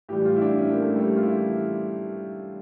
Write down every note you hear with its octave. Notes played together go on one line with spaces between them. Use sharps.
A2 E3 G3 G4
F4
E4
D4
C#4
A#3
A3
G3
F4
E4